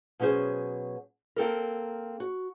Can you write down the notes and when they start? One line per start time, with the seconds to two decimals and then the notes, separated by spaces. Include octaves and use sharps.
0.20 B2 F#3 C#4 G#4 C5
1.36 A#3 C4 A4 A#4
2.20 F#4